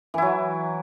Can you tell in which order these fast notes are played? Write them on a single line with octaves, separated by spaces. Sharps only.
E3 E4 F#3